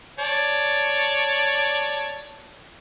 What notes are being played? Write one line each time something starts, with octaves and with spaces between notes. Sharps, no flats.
C#5 D5 A5